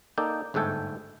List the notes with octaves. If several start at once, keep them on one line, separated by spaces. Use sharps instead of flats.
A#3 D#4 A4 D5 G5
G1 G#2 A3 A4 G5 G#5